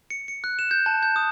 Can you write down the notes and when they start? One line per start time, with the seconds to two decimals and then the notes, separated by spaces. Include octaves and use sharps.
0.10 C#7
0.28 C#7
0.44 F#6
0.59 E7
0.71 G6
0.86 A5
1.03 G6
1.16 D#6